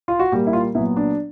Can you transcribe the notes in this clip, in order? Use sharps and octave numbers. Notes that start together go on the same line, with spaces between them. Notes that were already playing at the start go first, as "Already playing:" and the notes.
F4
F#4
A#2 G3 A#3 G4
E4
F4
A#2 F#3 B3 E4
D4